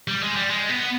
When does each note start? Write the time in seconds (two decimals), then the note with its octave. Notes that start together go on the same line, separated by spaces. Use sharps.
0.08 G3
0.21 G#3
0.36 G3
0.50 G#3
0.69 B3